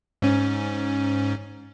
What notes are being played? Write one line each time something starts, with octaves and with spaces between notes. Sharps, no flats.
G#2 C#4